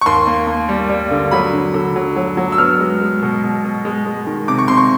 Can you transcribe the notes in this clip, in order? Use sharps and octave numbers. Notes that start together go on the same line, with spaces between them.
C#6
D#2 C6
A#3
A#3
G3
G3
D3
F#3 B5
D3
D3
F#3
F#3
F#3
E6
B3 F6
G#3
G#3
B2
B2
B2
G#3
G#3
D#3
C3 D6
C#6
C3 C6
C#6